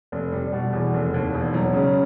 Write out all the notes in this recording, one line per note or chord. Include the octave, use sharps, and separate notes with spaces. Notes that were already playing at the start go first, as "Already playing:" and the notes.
F1
G3
B2
E2
F1
D#2
E1
F#3
C#3